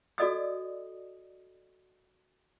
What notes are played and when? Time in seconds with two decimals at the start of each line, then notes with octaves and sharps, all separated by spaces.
0.18 F#4 A4 D5 D#5 D#6 E6